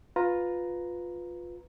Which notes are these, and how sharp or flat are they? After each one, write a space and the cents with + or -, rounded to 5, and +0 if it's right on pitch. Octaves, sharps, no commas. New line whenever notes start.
F4 +15 B4 +0 A#5 +0